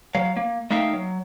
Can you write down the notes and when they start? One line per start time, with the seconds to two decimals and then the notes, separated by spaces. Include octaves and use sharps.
0.15 F#3 F5
0.37 A#3
0.71 A3 A#3 D#4 E5 F5 G5
0.93 F#3